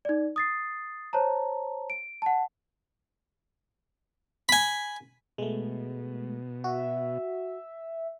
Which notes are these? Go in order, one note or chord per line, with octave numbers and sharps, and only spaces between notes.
D#4 D5
D#6 A6 C7
C5 C#5 A5 A#5
D7
F#5 A5
G#5 B5
B2 G#3 A3
F#4 E5